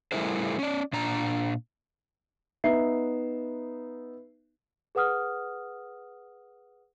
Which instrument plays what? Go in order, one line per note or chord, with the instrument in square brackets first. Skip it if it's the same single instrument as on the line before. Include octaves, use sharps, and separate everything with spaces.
[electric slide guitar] G3 A3 E4 G#4 A#4 C5
C#4 D5
A#2 D4 A#5
[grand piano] B3 D#4 E5 C7
[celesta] G#4 B4 F#5 D#6 F6